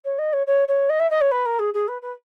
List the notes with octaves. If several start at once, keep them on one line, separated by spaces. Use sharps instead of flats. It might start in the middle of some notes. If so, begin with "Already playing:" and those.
C#5
D#5
C#5
C#5
C#5
D#5
E5
D#5
C#5
B4
A#4
G#4
G#4
B4
B4